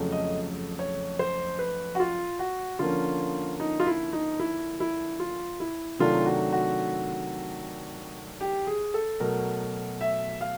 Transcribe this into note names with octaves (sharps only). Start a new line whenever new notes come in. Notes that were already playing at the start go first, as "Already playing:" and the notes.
Already playing: F2 C#3 F#3 A3
D#5
C#5
C5
B4
F#4
F4
F#4
D3 F3 A#3 C#4 F4
D#4
F4
E4
D#4
E4
E4
F4
E4
C3 D#3 F#3 A3 D4 F4
F#4
F#4
G4
G#4
A4
B2 F#3 A3 A#4
E5
F5